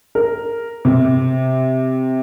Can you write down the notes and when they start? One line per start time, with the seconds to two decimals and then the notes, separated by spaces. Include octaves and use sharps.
0.15 A#4
0.85 C3